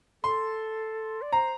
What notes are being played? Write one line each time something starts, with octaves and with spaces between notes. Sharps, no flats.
A4 C6
D5
C5 A#5